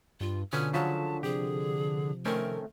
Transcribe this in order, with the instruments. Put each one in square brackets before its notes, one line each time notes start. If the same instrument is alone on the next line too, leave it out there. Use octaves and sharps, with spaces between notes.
[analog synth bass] G2 [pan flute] F4
[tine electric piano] B2 F4 D#6 [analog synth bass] D3 [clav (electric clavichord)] C#4 B4 G#5 [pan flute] F6
[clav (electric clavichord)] C#3 F3 F#3 [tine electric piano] F4 C#6 B6 [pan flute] A5
[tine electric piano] C3 F3 [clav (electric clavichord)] G4 [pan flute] G#4
[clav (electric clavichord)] D#3 C4 C#4 [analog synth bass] A3 [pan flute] A#4